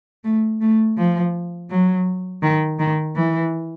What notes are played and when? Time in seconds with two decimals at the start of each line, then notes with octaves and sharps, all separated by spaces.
0.24 A3
0.61 A3
0.98 F3
1.70 F#3
2.43 D#3
2.79 D#3
3.16 E3